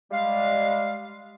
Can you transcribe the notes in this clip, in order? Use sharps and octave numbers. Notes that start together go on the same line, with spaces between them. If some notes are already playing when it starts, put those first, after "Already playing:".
G3 G#3 F5